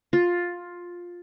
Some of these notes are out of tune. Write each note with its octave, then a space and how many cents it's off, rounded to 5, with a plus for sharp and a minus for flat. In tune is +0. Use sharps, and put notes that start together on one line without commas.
F4 +10